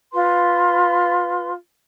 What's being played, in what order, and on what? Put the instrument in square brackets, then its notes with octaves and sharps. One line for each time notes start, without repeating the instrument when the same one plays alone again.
[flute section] F4 B4 C6